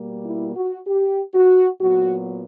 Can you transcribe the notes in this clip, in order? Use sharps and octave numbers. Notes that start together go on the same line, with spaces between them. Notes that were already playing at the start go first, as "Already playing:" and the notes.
Already playing: B2 G3 A#3
E4
F#4
G4
F#4
A#2 F#3 B3 F#4